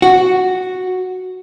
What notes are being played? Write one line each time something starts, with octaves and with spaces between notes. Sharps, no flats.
F#4